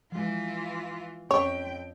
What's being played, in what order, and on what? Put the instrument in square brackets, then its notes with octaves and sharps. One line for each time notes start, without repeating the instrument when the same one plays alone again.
[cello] E3 F4 [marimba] F3 G#3
[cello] F2 G5 [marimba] C#4 [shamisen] C#5